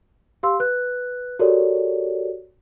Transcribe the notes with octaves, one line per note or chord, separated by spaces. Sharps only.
G4 F5 C6 E6
B4 F#6
F#4 G4 A4 A#4 C#5 D5